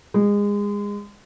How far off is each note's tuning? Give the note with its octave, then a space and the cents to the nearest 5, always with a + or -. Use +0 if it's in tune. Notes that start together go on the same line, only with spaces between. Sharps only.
G#3 -25